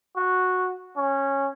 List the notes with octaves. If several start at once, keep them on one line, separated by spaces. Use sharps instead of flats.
F#4
C#4